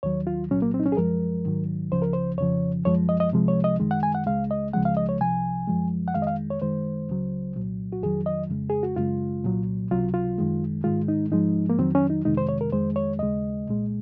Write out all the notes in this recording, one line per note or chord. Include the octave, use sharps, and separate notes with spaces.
D#2 D#3 F#3 C#5
F4
C2 A#2 F#3 C#4
A#3
C4
D#4
C#4
G#4
F#2 F3 G#3 A#4
G#2 D#3 F#3
C#2 C#3 F3 C5
A#4
C5
F2 C#3 F3 C#5
F#2 F3 G#3 C#5
D#5
D#5
C2 C3 F3 G#3
C#5
D#5
F#2 D#3 G#3
F#5
G#5
F#5
C#2 C#3 G#3 F5
D#5
C#2 C#3 F3 G#3 F#5
F5
D#5
C#5
C2 C3 F3 G#5
F#2 F3 G#3
F#5
F2 D#3 G#3 F5
D#5
F5
C#5
F#2 D#3 G#3 C5
C#2 C#3 F#3
C2 A#2 F#3
F#4
F2 D#3 F#3 G#4
D#5
F2 C#3 G#3
G#4
F#4
F#2 C#3 G#3 F4
C2 A#2 F#3
C#2 C3 F#3 F4
F4
F#2 D#3 G#3
G#2 D#3 G#3 F4
D#4
G#2 F3 G#3 D#4
A#3
F2 D#3 F#3 C4
C#4
D#4
F2 C3 D#3 G#3 D#4
C5
C#5
A#4
F2 D#3 G#3 C5
C#5
D#2 C#3 G#3 D#5
C2 A#2 G#3